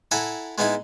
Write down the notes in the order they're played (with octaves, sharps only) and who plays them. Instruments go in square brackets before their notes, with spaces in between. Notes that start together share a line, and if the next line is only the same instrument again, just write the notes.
[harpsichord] E4 A4 F#5 G#5 A#5
G#3 B3 D#4 E4 G#4